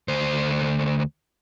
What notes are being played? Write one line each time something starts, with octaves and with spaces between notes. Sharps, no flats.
D2 C5